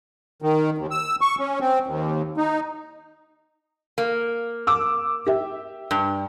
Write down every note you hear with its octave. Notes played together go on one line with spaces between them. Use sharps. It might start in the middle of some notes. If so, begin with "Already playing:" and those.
D#3
D#2
E6
C#6
C#4
C4
D#2
D#4
A#3
D6 E6
G4 E5
G2